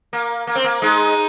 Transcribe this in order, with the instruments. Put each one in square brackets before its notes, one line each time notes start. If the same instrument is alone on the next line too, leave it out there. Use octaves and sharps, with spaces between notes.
[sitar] A#3
A#3
C4
A#3
[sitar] G#3 [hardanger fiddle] D#4